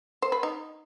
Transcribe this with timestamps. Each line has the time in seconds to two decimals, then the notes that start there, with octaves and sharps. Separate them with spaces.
0.22 C5
0.32 B4
0.43 D#4